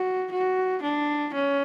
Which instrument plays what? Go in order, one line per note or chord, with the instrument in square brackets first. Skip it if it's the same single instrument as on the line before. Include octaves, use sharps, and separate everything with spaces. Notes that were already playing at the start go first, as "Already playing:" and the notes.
Already playing: [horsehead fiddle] F#4
F#4
D4
C#4